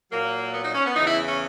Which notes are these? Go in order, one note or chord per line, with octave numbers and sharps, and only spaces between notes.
A#2 F#3 A#3
B3
D#4
C#4
B3
E2 C#3 E3 D#4
E4
C#4